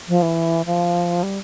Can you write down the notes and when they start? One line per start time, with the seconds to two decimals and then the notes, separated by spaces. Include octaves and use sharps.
0.08 F3
0.22 E3
0.66 F3
1.23 G3